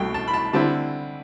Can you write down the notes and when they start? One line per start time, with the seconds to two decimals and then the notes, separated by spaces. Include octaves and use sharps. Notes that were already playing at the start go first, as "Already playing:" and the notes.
Already playing: C2 B2 A3 G5
0.14 A5
0.28 B5
0.34 A5
0.53 D3 G3 C4 E4 A5